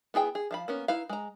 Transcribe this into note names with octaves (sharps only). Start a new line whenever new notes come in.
B3 E4 G#4 G5
G#4
F3 F5 B5
A#3 B3 C#4
D#4 E4 B4 F5
G#3 A#5